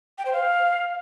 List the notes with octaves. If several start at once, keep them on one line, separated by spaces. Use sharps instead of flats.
G5
C5
F5